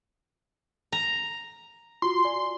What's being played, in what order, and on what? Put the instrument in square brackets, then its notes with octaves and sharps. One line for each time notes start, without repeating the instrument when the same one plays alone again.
[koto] A#5
[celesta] F4 F#4 [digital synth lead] C6
[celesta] D5 G#5